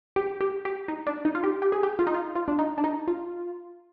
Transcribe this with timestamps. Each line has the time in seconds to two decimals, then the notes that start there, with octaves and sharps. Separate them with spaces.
0.16 G4
0.41 G4
0.65 G4
0.88 D#4
1.07 D4
1.25 D#4
1.35 F4
1.44 G4
1.62 G4
1.72 G#4
1.83 G4
1.99 F4
2.07 D#4
2.14 F4
2.35 F4
2.48 D4
2.59 D#4
2.78 D4
2.84 D#4
3.08 F4